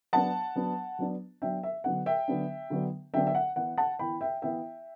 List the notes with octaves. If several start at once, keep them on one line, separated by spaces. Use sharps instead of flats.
F#3 B3 D4 F#5 A5
F#3 B3 D4
F#3 B3 D4
F#3 B3 D4 E5 G5
E5
D3 F#3 B3 D4 F#5
E5 G5
D3 F#3 B3 D4
D3 F#3 B3 D4
D3 F#3 B3 D4 E5 G5
E5
F#5
E3 B3 E4 F#5
F#5 A5
E3 B3 E4 G5 B5
E5 G5
E3 B3 E4 E5 G5